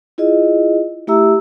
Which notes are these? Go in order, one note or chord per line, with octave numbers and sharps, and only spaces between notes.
E4 F4 G#4 D#5
A3 E4 G4 E5 A#5 E6